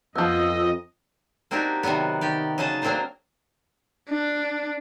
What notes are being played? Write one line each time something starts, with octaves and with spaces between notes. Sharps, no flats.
F2 F3 B3 D#5 E6
A#3 C4 D4 D#4 F#4 G4
C3 D#3 F#3 G3 B3
D#3 G4 D5
C#3 F#3 D#4 G#4 D#5 A5
F#3 A#3 C4 D4 C5 A#5
D4